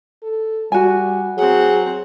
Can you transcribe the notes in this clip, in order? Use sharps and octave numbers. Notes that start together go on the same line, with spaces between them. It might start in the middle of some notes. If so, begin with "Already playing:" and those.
A4
G3 F#4 G#5
F#3 C4 G#4 F#5